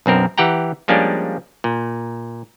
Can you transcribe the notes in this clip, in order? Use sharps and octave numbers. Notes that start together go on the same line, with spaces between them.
B1 F#2 C4 A#4
E3 G4 F#5 G5 A#5
F3 G3 G#3 A#3 C#4 D4
A#2